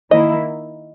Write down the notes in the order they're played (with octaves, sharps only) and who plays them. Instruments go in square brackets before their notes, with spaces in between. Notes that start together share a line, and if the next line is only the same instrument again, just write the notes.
[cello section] D#3 A#3 E4 [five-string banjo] D#5